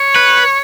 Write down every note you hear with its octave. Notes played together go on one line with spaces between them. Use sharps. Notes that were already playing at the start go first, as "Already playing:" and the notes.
Already playing: C#5
B4